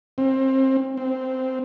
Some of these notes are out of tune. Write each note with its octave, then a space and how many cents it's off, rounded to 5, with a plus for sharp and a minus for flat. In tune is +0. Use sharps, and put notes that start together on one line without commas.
C4 +25
C4 -10